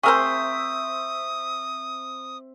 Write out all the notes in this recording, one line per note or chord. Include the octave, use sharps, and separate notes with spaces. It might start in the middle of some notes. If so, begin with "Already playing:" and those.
C4 G#4 A#4 C5 E5 C#6 D#6